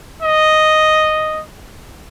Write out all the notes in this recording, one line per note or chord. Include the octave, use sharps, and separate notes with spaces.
D#5